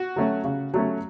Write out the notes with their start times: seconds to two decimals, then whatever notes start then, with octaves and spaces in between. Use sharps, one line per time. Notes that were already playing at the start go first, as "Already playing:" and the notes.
Already playing: F#4
0.16 F#3 A3 C#4
0.45 C#3
0.74 F#3 A3 C#4